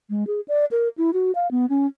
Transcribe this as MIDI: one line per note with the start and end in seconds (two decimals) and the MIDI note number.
0.10 0.24 56
0.27 0.40 68
0.48 0.65 74
0.71 0.88 70
0.98 1.11 64
1.13 1.32 66
1.35 1.49 77
1.51 1.66 59
1.70 1.86 61